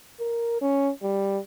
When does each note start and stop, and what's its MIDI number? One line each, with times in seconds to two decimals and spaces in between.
0.20 0.57 70
0.62 0.90 61
1.03 1.38 55